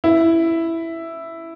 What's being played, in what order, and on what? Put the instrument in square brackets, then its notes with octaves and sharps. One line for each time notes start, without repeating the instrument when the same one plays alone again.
[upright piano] E4